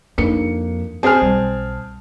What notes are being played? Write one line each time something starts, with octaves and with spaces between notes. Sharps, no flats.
F2 A#3 D4 D#4 C#7
C4 G#4 C5 A5 F6
B1 G3